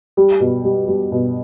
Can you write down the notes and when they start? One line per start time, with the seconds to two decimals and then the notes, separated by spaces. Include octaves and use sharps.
0.17 G3
0.40 B2
0.64 G3
0.88 G3
1.12 B2